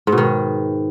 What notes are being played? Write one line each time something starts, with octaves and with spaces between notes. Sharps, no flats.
G#2
B2
D#3